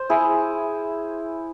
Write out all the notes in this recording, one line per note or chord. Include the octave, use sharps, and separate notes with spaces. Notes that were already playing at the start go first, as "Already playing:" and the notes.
Already playing: C5
E4 G#4